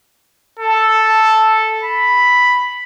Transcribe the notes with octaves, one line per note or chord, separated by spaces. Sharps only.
A4
B5